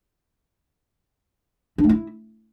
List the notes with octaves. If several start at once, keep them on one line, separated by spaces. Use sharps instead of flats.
D4
A3
E4